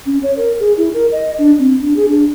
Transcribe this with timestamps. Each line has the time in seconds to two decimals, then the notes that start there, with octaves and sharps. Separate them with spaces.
0.06 C#4
0.23 C#5
0.37 A#4
0.60 G#4
0.77 E4
0.94 A#4
1.12 D#5
1.38 D4
1.59 C4
1.81 D4
1.96 G#4
2.08 D4